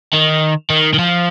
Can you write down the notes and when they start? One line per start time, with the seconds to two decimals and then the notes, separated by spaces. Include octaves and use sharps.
0.13 D#3
0.70 D#3
0.94 D#3
0.99 F3